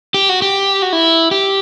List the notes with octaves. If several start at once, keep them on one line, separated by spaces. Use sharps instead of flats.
G4
F#4
G4
F#4
E4
G4